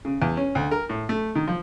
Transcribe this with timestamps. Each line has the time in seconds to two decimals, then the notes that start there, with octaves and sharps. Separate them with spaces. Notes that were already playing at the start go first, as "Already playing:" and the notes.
0.05 C#3
0.22 E2
0.37 C#4
0.55 D2
0.71 A#4
0.89 A2
1.09 A3
1.35 D#3
1.47 F3